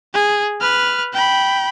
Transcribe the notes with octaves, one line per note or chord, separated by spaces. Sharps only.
G#4
B4 F6
G5 B5